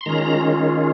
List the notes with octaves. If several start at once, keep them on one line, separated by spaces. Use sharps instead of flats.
C6
D#3 G#3 C#4 F4 A#5